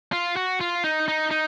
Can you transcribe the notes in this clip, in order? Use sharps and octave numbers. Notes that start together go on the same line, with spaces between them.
F4
F#4
F4
D#4
D#4
D#4